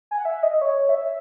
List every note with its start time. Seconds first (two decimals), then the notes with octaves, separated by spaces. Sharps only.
0.11 G#5
0.18 F#5
0.25 E5
0.43 D#5
0.62 C#5
0.89 E5